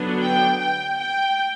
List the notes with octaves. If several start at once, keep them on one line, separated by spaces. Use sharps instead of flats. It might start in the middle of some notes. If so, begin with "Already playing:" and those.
Already playing: D3 F#3 B3 D4
G5
G5
G5